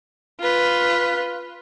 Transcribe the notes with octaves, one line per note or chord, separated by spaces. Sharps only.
F4 B4